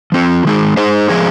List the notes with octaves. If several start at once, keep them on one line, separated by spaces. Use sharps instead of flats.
F3 C4 F4
D#3 G#3 D#4 G#4
G#3 D#4 G#4 C5
F3 G#3 C4 F4 G#4